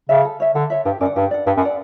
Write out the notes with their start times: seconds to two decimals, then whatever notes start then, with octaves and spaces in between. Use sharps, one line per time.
0.09 C#3 C#5 E5
0.24 A4
0.40 C#5 E5
0.55 D3 A4
0.70 C#5 E5
0.85 G2 G4
1.01 F#2 D5
1.05 F#5
1.16 G2 G4
1.31 D5 F#5
1.46 G2 G4
1.57 F#2
1.62 D5 F#5